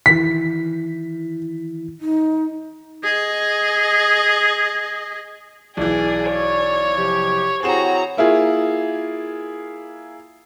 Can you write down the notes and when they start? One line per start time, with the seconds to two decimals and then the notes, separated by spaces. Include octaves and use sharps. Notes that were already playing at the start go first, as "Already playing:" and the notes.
0.06 D#3 E3 E4 B6
2.01 D#4
3.03 G#4 D#5
5.77 B1 E3 G#4 D5
6.31 C#5
6.96 C3 F3 G4
7.63 C4 E4 F#4 G#4 C5 C#5 A#5 E7
8.17 A#3 E4 F4 G#4